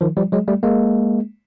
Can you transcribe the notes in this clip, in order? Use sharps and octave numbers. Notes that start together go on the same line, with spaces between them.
D#3 F3
F3 G3
F#3 G#3
G3 A3
G#3 A#3